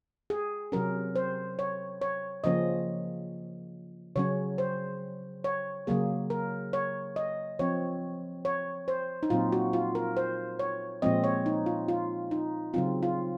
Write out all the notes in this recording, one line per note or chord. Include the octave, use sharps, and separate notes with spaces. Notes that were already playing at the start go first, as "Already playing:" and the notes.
G#4
C3 F#3 C#4 A#4
C5
C#5
C#5
C#3 F3 A#3 C#4 D#5
C#3 F#3 C#4 C#5
C5
C#5
C#3 F#3 A#3 G#4
A#4
C#5
D#5
F3 C4 C#5
C#5
C5
D#4
A#2 F#3 C4 F4
F#4
F4
A#4
C5
C#5
A#2 F3 G#3 C4 D#5
C#5
D#4
F4
F4
D#4
C#3 F#3 C4 F4
F4